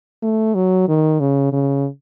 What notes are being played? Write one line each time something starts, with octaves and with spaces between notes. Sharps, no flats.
A3
F#3
D#3
C#3
C#3